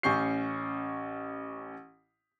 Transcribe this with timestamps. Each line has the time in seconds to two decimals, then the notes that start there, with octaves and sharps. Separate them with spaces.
0.03 A1 C#4 C#6 G6 C7